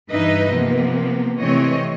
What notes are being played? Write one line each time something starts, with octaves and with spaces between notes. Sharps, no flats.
G2 E3 D#4 B4 D#5 E5
C3 F3 A#3 B3
C3 E3 A3 C4 C#5 D#5